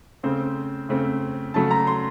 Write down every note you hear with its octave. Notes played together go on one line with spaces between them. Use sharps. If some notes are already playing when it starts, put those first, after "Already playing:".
C#3 A3 C4 C5
C#3 A3 C4
C#3 F#3 A3 A5
A#5
C6